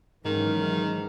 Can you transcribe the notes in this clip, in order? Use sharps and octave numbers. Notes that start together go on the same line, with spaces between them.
G#2 D#3 E3 F#3 C#4 A#4